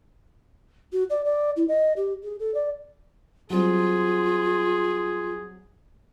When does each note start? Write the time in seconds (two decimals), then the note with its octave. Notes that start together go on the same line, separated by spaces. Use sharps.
0.92 F#4
1.10 D5
1.25 D5
1.56 E4
1.68 D#5
1.96 G4
2.23 G#4
2.39 A4
2.54 D5
3.50 F#3 G3 C4 F4 G#4